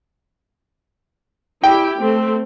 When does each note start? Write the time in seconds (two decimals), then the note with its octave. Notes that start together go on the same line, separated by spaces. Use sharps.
1.64 E4 G4 G5
2.01 A3 C4